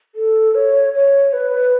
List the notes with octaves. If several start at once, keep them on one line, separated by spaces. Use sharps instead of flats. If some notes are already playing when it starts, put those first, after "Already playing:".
A4
C#5
C#5
B4